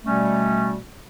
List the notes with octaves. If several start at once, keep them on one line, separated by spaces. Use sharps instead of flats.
B2 G3 A3 C#4